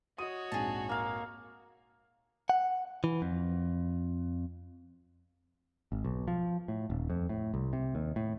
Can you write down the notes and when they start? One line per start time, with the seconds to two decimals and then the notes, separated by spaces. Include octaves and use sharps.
0.18 F#4 C#5 D#5 D#6 D#7
0.52 A#1 F2 G#2 G#4 A5
0.89 A#3 F5
2.50 F#5
3.04 E3
3.22 F2
5.92 G#1
6.04 B1
6.28 F3
6.68 A2
6.90 D#1
7.10 F2
7.29 A2
7.54 C2
7.73 C3
7.95 D#2
8.16 A2